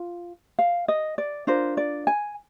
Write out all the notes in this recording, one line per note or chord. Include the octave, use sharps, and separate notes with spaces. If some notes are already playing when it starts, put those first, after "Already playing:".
Already playing: F4
F5
D#5
D5
D4 F4 A#4 C5
D5
G#5